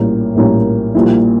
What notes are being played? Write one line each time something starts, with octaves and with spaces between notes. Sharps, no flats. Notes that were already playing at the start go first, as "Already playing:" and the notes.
Already playing: A#1 A2 G3 A#3 C#4
A#1 A2 G3 A#3 C#4
A#1 A#2 G3 A#3 E4